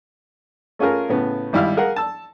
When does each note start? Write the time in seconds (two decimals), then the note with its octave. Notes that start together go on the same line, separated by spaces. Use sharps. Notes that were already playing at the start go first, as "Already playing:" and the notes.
0.79 A3 C#4 F4 G#4 A#4
1.09 A2 C#3 B3
1.53 G#1 G3 E4 F5 F6
1.77 G#4 A#4 F5 F#5
1.96 A5 E6